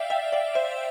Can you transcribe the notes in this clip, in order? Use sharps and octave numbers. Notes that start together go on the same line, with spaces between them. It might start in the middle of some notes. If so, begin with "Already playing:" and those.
Already playing: D5 E5 F5 G5
E5 G5
D5 F5
C5 E5